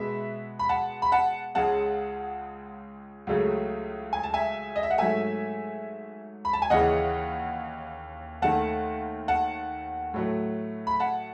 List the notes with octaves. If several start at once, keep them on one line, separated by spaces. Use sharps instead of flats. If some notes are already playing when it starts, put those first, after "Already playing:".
Already playing: B2 G#3 B3 E5
B5
F#5 A5
B5
F#5 A5
C#2 C#3 G#3 F#5 A5
C#2 C#3 F#3 A3
G#5
A5
E5 G#5
D#5
E5
F#5
G#2 F#3 A3 E5 G#5
B5
A5
G#5
D#2 C#3 E3 D#5 F#5
D#2 D#3 A3 F#5 A5
F#5 A5
A2 F#3 A3
B5
F#5 A5